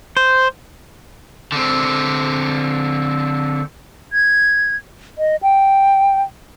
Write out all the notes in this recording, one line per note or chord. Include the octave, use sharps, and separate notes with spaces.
C5
D3 C4
G#6
D#5
G5